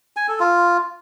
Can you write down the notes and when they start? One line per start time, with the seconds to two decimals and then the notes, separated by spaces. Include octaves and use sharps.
0.17 G#5
0.28 A4
0.40 F4